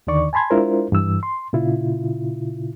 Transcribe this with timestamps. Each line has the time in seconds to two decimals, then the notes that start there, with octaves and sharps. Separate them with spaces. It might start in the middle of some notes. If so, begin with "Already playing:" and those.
0.07 D#2 D3 D#3 D5 C#6
0.33 G#5 A5 B5 C6 G#6
0.50 G#3 D4 E4 F4 A#4 C5
0.92 G2 E3 E6
1.23 C6
1.53 A#2 C#3 E4 F4